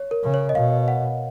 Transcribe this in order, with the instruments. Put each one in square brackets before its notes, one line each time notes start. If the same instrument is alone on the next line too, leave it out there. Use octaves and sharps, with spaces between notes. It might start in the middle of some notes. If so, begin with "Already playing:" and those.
Already playing: [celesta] C#5
A#4
[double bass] C#3
[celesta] C#5
D#5
[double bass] B2 [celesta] F5
[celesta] F#5